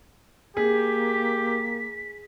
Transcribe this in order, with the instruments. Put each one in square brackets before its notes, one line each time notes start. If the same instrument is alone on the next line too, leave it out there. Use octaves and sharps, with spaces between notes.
[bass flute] A#3 [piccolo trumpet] G4 [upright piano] G#4 [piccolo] B6